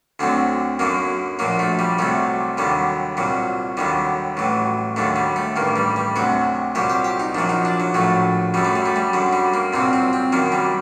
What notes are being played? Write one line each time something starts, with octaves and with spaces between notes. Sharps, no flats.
D2 D3 F#3 C4
F#2 D3 F#3 A#3
A#1 A#2 F#3 A#3
A3
G3
C2 C3 F#3 A3
D#2 D3 F#3 G3
C2 A#2 F#3
D#2 D3 F#3 G3
A1 A2 F#3
D#2 D3 F#3 A3
G3
A3
A1 G2 D#3 A#3
G3
G3
D2 C3 F#3 F#4
C2 A#2 F#3 G4
G4
G4
D#4
A#1 A#2 F#3 D4
D#4
D4
F#3
A#1 A2 F#3 A3
F#2 F#3 G3
A3
G3
A3
G3
F#2 D3 F#3
G3
A#3
C2 A#2 F#3 C4
C4
C4
F#2 D#3 F#3 A#3
G3